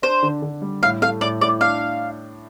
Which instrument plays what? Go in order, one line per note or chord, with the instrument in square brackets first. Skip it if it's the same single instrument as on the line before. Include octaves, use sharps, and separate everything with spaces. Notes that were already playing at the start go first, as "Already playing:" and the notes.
[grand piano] D4 [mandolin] C5
[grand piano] D3
D3
G3
[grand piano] A2 [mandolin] F5
[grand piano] A3 [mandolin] F5
[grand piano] A2 [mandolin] D5
[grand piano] A2 [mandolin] D5
[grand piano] D4 [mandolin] F5